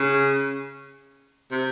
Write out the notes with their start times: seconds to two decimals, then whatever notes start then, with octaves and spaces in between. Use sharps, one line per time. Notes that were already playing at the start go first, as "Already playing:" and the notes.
Already playing: C#3
1.51 C3